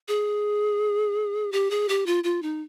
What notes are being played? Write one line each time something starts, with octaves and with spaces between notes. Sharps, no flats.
G#4
G4
G#4
G4
F4
F4
D#4